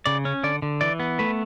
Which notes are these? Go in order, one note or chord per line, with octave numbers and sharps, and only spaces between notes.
C#3 D5
C#4
D3 D5
D3
E3 D5
B3
A3 B4